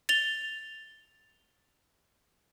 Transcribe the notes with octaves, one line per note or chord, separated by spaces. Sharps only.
A6 F7 G7